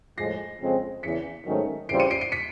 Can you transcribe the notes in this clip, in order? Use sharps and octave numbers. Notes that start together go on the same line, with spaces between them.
A2 F3 G#3 A#6 C7
F2 C#3 F3 G#3 C4
E2 C#3 E3 B6 C#7
G#2 D#3 F#3 A3 C#4
C#3 E3 G3 C4 F4 C7 D7
C#7 D#7
C7 D7
C7 D7
B6 C#7